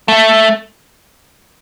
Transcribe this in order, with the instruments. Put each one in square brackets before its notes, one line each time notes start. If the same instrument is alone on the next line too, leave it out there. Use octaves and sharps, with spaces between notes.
[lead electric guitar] A3